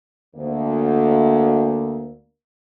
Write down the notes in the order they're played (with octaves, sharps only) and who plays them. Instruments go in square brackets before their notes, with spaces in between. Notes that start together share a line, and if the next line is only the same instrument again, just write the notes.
[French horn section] D2 A#3